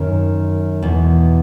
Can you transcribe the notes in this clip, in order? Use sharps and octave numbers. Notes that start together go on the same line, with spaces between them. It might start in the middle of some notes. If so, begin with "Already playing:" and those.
Already playing: F#2 D#3
E2 B2